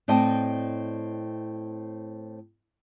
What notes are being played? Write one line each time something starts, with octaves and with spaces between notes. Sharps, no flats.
A2 C4 D5 D#5 G5 A5